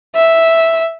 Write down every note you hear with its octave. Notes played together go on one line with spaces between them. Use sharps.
E5